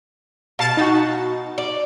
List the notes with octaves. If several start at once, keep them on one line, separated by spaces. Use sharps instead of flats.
B2 F5 A5 A6
D#4 F#4
D5